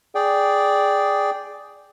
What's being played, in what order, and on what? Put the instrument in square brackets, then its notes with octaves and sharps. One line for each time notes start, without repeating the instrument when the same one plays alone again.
[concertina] G#4 D5 G5